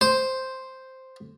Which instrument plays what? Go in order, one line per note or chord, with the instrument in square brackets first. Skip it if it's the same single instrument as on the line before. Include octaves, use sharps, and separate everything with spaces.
[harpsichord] C5